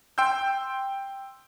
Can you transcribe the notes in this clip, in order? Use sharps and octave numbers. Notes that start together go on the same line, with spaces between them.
G5 C6 E6 G6